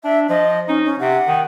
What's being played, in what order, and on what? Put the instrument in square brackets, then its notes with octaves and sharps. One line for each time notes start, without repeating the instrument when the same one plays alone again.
[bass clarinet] D4 [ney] E5
[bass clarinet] F3 [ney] D#5
[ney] C#4 [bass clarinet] D#4
[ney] C#4
[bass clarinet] C3 [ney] F#5
[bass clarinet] D#3